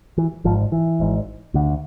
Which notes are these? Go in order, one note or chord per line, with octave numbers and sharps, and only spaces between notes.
E3
G#1 G#2 F3
E3
G#1 G#2
D2 D3